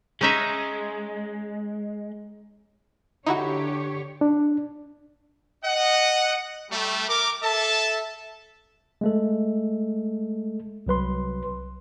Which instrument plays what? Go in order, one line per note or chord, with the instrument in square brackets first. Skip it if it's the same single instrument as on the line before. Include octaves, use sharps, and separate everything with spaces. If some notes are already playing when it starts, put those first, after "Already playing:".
[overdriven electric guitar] G#3 [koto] C#4 D#4 E5
[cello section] D3 G4 C#5 [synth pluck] D#4 E4 F#4
[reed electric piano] D4
[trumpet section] D#5 F#5
G3 A3
A#4 D6
A4 E5 A5
[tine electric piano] G#3 A3 A4
C2 F#3 B4 C6